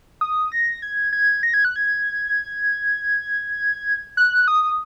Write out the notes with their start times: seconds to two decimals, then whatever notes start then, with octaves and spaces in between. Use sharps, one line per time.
0.21 D#6
0.52 A#6
0.82 G#6
1.13 G#6
1.43 A#6
1.54 G#6
1.65 F#6
1.76 G#6
4.17 F#6
4.48 D#6